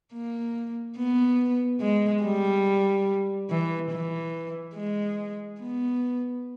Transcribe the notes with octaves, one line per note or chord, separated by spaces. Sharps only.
A#3
B3
G#3
G3
E3
E3
G#3
B3